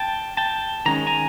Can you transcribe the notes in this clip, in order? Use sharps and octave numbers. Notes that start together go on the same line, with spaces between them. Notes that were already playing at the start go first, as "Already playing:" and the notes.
Already playing: G5 A5
G5 A5
D#3 G#3 C#4 A#5
G#5 A#5